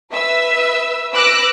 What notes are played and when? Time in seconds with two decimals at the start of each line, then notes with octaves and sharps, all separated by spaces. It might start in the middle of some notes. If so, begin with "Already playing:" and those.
0.11 B4 E5 E6
1.14 B4 D6 E6 F#6 A#6